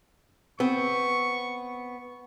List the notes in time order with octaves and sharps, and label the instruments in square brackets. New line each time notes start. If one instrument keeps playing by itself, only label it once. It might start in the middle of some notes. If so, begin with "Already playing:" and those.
[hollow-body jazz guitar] B3 C4 [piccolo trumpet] C#6